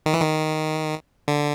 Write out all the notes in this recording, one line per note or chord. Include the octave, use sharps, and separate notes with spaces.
D#3
E3
D#3
D3